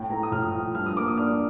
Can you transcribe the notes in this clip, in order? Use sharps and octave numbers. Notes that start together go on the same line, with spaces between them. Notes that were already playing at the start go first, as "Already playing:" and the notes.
Already playing: A2 G5
A3 A#5
D#6
A2 F6
F3
G2 F6
D#6
A#3 D6
D#6
D4 F6